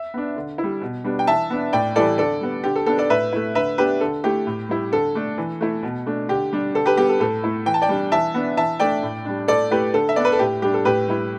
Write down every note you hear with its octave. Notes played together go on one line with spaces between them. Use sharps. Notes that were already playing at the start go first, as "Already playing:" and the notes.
Already playing: E5
B3 D4
D3
E4
G3
B2
G3 B3 D4
G5
E3 E5 A5
B3 D4
A2 D5 G5
E3 G3 E4 A4 D5
D3 A4 D5
G3 B3
D3 G4
A4
B3 D4 A4
A4 D5
A2 B4 E5
A3 E4
D3 B4 E5
B3 D4 G4 B4
D3 A4
A3 E4 G4
A2
G3 E4
D3 A4
A3 D4
E3
A3 E4
B2
A3 D4
D3 G4
G3 D4
D3 A4
G4 B4
G3 B3 G4
A4
A2 A4
A3 E4
E3 G5
A5
D5 G5
G3 D4
E3 E5 A5
B3 D4
E3 E5 A5
A3 D4 D5 G5
A2
G3 D4
A2 A4 D5
A3 E4 G4 B4
D3 A4
E5
B3 D4 D5
B4
A4
A2 G4
G3 D4 G4
A4
A2 G4 B4
G3 E4